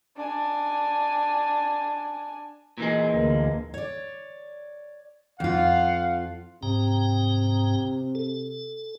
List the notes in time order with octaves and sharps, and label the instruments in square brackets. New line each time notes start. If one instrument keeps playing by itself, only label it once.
[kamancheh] D4 G#5
[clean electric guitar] A#2 E3 G#3
[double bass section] D2 D3 A#3
[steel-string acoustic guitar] C#5 D5
[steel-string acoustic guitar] F2 F4 [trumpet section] F5 F#5
[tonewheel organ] G#2 G5 A#5 [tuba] C3
[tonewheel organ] A4